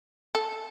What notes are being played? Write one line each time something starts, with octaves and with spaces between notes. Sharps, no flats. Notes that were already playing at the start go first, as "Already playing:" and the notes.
A4